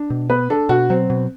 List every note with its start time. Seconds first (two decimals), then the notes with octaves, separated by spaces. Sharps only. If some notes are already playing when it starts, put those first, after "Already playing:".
Already playing: D4
0.10 B2
0.30 B3 B4
0.50 D4 A4
0.69 B2 F#4
0.90 F#3 C4
1.10 B2